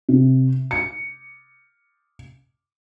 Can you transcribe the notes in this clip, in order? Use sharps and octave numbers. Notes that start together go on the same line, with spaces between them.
C3
C#7